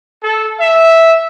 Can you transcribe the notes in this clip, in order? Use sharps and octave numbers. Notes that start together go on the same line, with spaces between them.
A4
E5